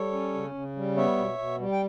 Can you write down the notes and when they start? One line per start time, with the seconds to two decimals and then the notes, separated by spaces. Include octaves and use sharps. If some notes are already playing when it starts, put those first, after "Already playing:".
Already playing: G3 A4 C#5
0.12 C#4
0.34 C#3
0.54 C#3
0.76 G3
0.96 B3 C#5 E5
1.18 B2
1.38 B2
1.60 G3
1.72 G5